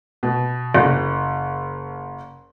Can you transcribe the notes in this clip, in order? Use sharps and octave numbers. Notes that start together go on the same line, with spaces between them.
B2
F#1